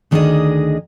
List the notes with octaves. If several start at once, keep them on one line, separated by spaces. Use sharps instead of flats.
D2 D#3 D4 D#4 G#4 D#5